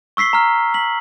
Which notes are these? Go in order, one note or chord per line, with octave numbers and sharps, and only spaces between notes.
C#6 E6 B6 C7 G7
A#5 F6
B6 F#7